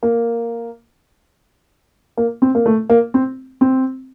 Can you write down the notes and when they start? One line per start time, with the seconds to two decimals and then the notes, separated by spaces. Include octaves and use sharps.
0.03 A#3
2.17 A#3
2.42 C4
2.55 A#3
2.66 A3
2.90 A#3
3.14 C4
3.61 C4